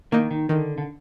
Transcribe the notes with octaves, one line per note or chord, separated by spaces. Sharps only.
D#3 A#3 D#4
D#3
D3 D#3
D3